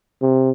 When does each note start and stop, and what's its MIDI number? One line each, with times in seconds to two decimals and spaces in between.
0.22 0.51 48